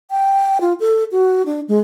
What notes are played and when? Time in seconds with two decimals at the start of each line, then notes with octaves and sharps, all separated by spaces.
0.11 G5
0.61 F4
0.80 A4
1.12 F#4
1.46 D4
1.68 G#3